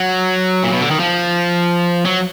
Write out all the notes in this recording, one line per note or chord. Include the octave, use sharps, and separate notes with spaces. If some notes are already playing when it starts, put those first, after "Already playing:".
Already playing: F#3
A#2
B2
D3
D#3
F3
F#3